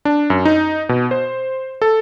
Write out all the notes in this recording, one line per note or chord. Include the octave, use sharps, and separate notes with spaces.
D4
F#2
D#4
B2
C5
A4